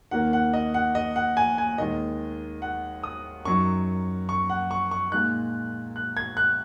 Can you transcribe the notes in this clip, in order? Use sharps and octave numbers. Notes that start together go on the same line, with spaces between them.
D#2 D#3 A#3 F#5
F#5
D#5
F#5
D#5
F#5
G#5
G#5
D#2 D#3 G#3 D#5
F#5
D#6
F#2 F#3 D#4 C#6
C#6
F#5
C#6
C#6
A#2 G#3 D#4 F#6
F#6
G#6
F#6